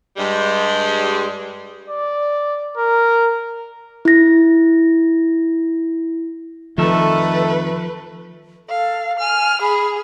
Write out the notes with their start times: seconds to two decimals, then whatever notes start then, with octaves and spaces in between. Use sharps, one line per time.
0.17 G2 G3 G#3
1.88 D5
2.77 A#4
4.05 E4 A#6
6.78 F2 D#3 F3 A3 A4 B4 E5
8.69 A4 F5
9.19 G#5 F6
9.61 G#4 B5